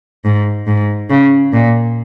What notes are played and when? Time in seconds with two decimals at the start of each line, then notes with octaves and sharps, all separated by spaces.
0.25 G#2
0.67 G#2
1.10 C#3
1.53 A#2